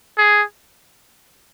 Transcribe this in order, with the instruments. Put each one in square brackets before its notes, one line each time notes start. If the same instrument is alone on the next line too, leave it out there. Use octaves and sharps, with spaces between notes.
[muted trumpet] G#4